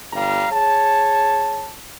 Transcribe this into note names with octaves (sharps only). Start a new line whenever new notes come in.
G1 G3 F5 A#5
G#4 C#5 A5